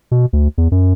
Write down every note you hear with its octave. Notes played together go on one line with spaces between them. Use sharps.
B2
D2
E2
F#2